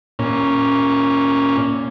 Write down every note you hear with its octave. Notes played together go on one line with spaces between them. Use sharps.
A#2 C#4